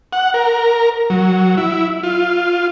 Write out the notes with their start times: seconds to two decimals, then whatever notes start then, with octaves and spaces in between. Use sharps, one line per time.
0.13 F#5
0.34 A#4
1.10 F#3
1.57 E4
2.03 F4